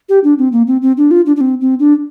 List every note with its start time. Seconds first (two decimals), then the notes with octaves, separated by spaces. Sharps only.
0.09 G4
0.24 D4
0.38 C4
0.52 A#3
0.67 C4
0.82 C4
0.97 D4
1.11 F4
1.26 D4
1.36 D4
1.41 C4
1.61 C4
1.80 D4